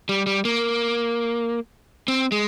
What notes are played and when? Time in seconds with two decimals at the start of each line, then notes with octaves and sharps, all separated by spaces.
0.09 G3
0.26 G3
0.45 A#3
2.08 C4
2.32 G#3